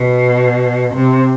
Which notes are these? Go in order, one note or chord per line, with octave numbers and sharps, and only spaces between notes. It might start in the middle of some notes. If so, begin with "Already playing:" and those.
Already playing: B2
C3